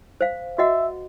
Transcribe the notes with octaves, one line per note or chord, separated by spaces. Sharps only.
C5 F5
F#4 D#5 E5 F#5